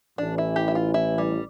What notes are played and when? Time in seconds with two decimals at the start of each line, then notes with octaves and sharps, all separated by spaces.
0.18 A1 A2 E3 D4
0.38 E4
0.56 G4
0.68 E4
0.75 F4
0.94 E4
1.18 G3